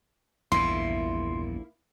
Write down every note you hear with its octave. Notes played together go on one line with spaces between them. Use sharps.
A#1 E2 G2 A#2 A#3 E4 C6